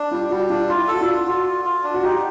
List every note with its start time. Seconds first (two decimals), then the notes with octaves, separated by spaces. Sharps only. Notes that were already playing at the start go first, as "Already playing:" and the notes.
Already playing: D4
0.11 G3 F4
0.30 G3 F#4
0.50 D4 F4
0.69 F4
0.75 E4
0.88 A4
0.94 F#4
1.01 F4
1.07 D4
1.27 F4 F#4
1.46 F4
1.65 F4
1.84 D4
1.94 F#4
2.03 D#4 G4